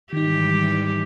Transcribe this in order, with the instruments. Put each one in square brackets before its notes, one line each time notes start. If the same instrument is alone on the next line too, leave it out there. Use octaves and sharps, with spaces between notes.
[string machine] G#2 E3 G3 [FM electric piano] D#3 D#4 [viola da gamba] G4